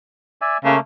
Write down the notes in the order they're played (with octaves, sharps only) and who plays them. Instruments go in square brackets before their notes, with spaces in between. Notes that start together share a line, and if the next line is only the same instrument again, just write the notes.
[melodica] D5 E5 G#5
[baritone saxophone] C#3 [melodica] A3 A#3